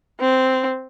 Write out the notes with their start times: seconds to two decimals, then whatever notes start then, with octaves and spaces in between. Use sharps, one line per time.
0.20 C4